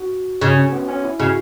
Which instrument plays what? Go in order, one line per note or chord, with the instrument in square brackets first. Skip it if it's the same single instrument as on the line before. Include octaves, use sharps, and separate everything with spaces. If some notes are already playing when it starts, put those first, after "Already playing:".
Already playing: [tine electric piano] F#4
[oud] C#3
[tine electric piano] C#4
B3
C#4
E4
[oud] C#3 [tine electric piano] F#4